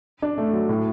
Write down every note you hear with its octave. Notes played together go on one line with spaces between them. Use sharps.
D4
A3
F#3
A2